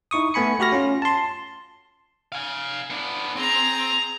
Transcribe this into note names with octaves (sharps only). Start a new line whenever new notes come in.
D#4 E4 C#6 D#6
A3 B3 G#5 B5 C#7
A3 F#4 G4 B5 F6 A#6
C#4 F4
A5 C6
F5 G#5
B3 D4
C4 G#4 A#5 C6